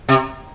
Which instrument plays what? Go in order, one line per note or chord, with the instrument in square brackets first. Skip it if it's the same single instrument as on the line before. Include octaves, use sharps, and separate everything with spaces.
[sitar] C3